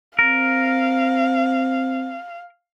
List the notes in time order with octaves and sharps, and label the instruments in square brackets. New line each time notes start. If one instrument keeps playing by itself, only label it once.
[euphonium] C4 [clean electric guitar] A#4 [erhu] F5